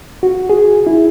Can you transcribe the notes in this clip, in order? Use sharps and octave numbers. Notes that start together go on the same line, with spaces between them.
F#4
G#4
E4